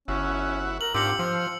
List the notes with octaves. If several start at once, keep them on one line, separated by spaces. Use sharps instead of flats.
G1 C#4 E4 F#4
A#4 F#7
G#2 C4 D4 F4 G4 E6 C#7 F#7
F3 F4 C5